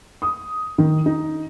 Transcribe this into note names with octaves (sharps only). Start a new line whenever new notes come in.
D#6
D#3
D#4